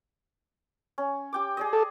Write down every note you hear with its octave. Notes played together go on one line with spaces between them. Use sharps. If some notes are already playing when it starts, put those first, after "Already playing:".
C#4
G4 G5 D6
G#4 D5 D#5
A4